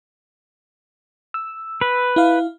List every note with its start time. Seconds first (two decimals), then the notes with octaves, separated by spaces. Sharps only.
1.34 E6
1.81 B4
2.16 E4 F5